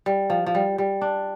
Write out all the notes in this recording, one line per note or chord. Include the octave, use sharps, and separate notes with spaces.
G3
F3
F3
G3
G3
D4